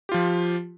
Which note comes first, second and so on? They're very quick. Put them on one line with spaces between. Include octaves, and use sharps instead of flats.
G4 F4 F3